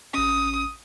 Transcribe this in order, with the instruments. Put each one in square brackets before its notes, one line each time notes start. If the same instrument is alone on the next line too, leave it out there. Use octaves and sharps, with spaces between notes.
[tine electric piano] A1 C#4 [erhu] D#6